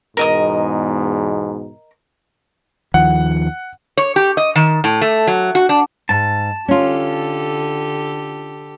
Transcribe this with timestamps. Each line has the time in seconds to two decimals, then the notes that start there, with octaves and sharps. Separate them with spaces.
0.17 E2 G#2 B2 A#4 D#5 D#6
2.94 D#2 D#3 F3 F#5
3.97 C#5
4.16 G4
4.37 D#5
4.56 D#3
4.84 A2
5.02 A3
5.27 F#3
5.55 F#4
5.69 D4
6.09 G#2 A5
6.68 D3 C#4 F4 G4 A4